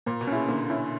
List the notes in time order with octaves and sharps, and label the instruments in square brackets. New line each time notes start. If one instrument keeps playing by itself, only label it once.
[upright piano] A#2 [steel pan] A#3
[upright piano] B2
[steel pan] C#4
[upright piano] C#3 [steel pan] E4
[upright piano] D3 [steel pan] A#3
[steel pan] C#4 E4